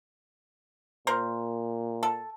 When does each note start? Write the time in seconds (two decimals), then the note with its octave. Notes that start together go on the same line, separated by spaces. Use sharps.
1.07 A#2 A#4 C5
2.03 A4